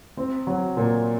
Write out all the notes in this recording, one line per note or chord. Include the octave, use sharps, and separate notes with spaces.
C4
F#3
A#2